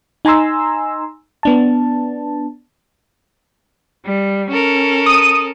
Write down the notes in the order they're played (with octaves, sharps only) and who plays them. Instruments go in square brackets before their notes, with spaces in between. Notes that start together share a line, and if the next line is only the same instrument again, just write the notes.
[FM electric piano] D#4 G#5 A#5 C6 E6
B3 D4 A5
[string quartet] G3
C#4 A4 A#4
[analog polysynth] D#6 D#7